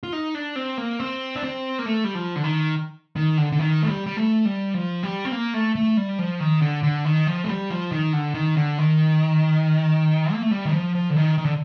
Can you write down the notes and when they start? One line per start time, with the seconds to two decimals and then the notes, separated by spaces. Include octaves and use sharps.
0.03 F4
0.13 D#4
0.35 D4
0.56 C4
0.78 A#3
1.00 C4
1.36 D4
1.43 C4
1.79 A#3
1.86 A3
2.04 G3
2.15 F3
2.36 D3
2.44 D#3
3.16 D#3
3.38 D3
3.52 D3
3.59 D#3
3.82 A3
3.88 G3
4.07 G3
4.17 A3
4.45 G3
4.74 F3
5.03 G3
5.25 C4
5.32 A#3
5.54 A3
5.75 A3
5.97 G3
6.19 F3
6.40 D#3
6.62 D3
6.83 D3
7.05 D#3
7.27 F3
7.44 A3
7.48 G3
7.70 F3
7.92 D#3
8.13 D3
8.34 D#3
8.57 D3
8.78 D#3
10.33 A#3
10.42 A3
10.51 G3
10.66 D#3
10.73 F3
10.95 F3
11.10 D3
11.16 D#3
11.38 D#3
11.45 D3